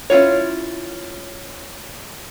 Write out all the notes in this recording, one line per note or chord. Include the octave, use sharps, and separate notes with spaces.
C#4 E4 F4 C#5